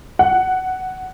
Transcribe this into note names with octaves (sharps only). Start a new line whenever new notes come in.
F#5